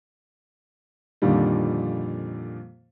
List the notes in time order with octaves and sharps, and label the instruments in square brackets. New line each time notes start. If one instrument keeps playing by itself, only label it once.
[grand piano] F2 A#2 D3 D#3 F3 G3